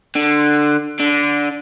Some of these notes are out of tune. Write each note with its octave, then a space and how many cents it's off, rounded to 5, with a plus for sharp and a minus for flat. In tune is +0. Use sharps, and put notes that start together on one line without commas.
D3 +15
D3 -10